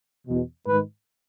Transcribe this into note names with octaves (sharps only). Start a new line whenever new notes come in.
E2 B2
G#2 D#3 B4